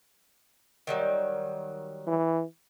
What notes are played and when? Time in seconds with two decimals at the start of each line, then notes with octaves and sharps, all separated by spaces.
0.87 D#3 F#3 G3
2.07 E3